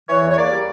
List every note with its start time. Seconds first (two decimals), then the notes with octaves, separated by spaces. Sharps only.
0.08 E3 C#5
0.22 E2
0.30 C#5
0.37 A#3 D5
0.51 G3